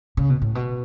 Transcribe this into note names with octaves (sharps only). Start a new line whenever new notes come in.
C#3
B2
A2
B2